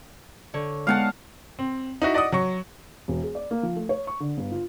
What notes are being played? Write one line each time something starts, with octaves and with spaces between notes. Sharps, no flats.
D3 C#5
G#3 B3 D#4 F5 F#5 A5
C4
D#4 E4 F#4
D5 D#5 F#5 D#6
F#3 C#6
E1
G#4
D5
A#3
F3
A3
C#5
C#6
D3
G1
F4